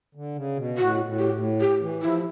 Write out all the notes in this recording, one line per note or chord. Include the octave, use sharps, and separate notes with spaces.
D3
C#3
B2
A2 F#4
A2
G4
A2
G4
E3
F3 E4